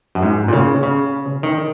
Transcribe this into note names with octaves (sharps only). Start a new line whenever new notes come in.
F#2
G#2
A#2
C#3
C#3
D#3